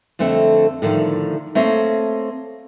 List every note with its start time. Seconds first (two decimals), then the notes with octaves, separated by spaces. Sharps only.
0.19 F2 D3 A3 C4
0.82 A2 D3 D#3 F3
1.55 A3 A#3 C4 A4 C#5 D#5